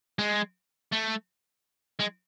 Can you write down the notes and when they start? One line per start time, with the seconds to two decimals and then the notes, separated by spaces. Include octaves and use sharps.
0.19 G#3
0.92 A3
2.00 G#3